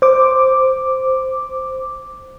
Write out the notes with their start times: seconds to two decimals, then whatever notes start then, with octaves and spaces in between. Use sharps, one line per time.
0.02 C5 D6